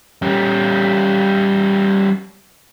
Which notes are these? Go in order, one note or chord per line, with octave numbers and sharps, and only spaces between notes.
G3 C#4